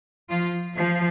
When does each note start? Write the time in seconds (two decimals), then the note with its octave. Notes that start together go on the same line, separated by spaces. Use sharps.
0.30 F3 F4
0.75 F3 F4